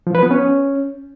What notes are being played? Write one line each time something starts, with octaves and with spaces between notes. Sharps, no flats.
F3
B4
B3
C#4